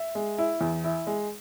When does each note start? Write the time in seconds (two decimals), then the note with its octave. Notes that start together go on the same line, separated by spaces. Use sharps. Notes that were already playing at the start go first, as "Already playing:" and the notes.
Already playing: E5
0.15 G#3
0.38 E4
0.61 E2
0.84 E4
1.07 G#3